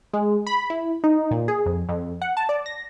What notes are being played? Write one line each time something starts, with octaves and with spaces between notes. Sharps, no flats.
G#3
B5
E4
D#4
A#2
G#4
F2
F2
F#5
A5
D5
A#6